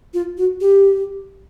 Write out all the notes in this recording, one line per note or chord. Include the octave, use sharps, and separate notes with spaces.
F4
F#4
G4